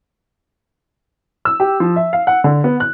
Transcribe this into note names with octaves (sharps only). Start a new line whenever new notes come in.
E6
G4
F3
E5
F5
F#5
D3
B3
F#6